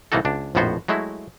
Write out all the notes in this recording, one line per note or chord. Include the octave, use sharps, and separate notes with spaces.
C2 E3 A#3 D#4 F#4 A4
C#2 D4
A#1 F2 A2 B3 F#4 C5
F#3 G#3 A3 E4